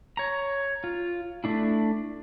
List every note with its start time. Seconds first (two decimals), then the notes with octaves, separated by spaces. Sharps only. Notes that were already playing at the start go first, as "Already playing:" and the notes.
0.17 C#5 A#5
0.84 F4
1.44 A3 D4 E4